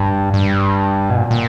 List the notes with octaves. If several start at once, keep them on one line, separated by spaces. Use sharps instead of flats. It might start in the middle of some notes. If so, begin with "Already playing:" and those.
Already playing: G2
G2
B2
A#2
A#2